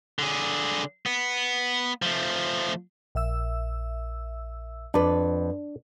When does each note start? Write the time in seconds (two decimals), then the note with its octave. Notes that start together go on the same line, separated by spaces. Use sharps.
0.19 D3 G#4
1.06 B3
2.02 F3 A3
3.15 A#1 E5 E6
4.94 F2 D4 B4